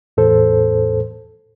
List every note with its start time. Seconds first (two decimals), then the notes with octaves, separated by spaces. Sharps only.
0.17 E2 A2 A4 C5